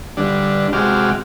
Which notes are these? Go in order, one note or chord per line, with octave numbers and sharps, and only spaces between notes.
D3 G3 D4
C3 G#3 F#4 G5 D6 F6